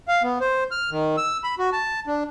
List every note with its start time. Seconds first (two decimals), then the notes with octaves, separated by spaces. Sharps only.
0.08 F5
0.23 B3
0.41 C5
0.71 F6
0.91 D#3
1.17 E6
1.44 B5
1.59 F#4
1.73 A5
2.07 D4